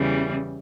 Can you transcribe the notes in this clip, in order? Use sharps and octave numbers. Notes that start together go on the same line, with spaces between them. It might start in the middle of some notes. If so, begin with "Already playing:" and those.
Already playing: E2 C#3 E3 G3